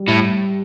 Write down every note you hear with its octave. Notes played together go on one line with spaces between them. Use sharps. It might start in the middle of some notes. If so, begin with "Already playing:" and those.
Already playing: G3
A2